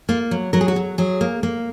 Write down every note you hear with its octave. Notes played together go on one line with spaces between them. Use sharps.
A#3 F4
F#3
F#3 A#4
G#4
F#4
F#3
F#3 G#4
A#3
A#3